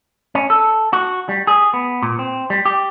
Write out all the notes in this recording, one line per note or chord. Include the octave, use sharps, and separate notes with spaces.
C#4
A4
F#4
G3
G#4
B3
A#2
C4
G3
G4